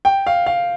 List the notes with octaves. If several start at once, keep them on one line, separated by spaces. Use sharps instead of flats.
G5
F5
F5